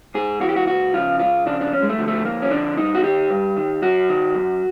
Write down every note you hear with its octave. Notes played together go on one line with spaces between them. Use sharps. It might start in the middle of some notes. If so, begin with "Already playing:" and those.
G#2 G#4
E3 F#4
G4
F#4
C#2 F#4
C#3 F3 F4
C#2 F4
C#3 F3 D4
D4
F2 C#4
G#3
A3
D3 F3
A3
F2 A#3
C#4
D3 F3 D4
G2 D#4
F#4
D#3 G4
G2
D#3
F#2 F#4
D#3
F#2